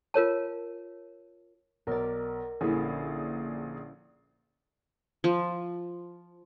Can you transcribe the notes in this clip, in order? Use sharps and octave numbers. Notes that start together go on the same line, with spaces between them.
F4 A#4 C#5 A5
B1 A#4 D5
A#1 D3 C#4 E4 G#4
F3